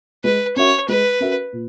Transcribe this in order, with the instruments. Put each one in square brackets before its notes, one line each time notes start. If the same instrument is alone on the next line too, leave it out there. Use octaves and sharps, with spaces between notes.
[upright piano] G#3 [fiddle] B4
[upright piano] C#4 F#4 A#4 E5 [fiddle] C#5
[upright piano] G#3 [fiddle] B4
[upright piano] C#4 F#4 A#4 E5
A#2